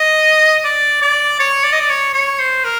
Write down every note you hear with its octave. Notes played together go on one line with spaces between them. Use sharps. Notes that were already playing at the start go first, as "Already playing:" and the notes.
Already playing: D#5
D5
D5
C#5
D5
D#5
D5
C#5
C#5
C5
A#4